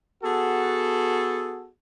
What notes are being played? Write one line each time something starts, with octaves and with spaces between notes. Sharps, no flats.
B3 F#4 G#4 A4